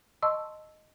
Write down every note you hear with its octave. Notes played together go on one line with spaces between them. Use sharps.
D#5 A5 C6 C#6 E6